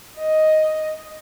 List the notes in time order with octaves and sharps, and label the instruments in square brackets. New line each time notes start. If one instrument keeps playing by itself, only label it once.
[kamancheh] D#5